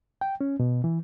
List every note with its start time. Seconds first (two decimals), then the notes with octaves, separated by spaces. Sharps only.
0.21 G5
0.41 C#4
0.60 B2
0.84 E3